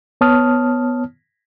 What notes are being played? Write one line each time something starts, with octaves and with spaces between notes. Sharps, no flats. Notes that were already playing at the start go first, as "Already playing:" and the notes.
B3 C#5 A5 D#6 F6